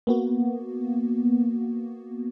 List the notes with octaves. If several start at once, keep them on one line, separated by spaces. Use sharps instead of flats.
A#3 B3 F#4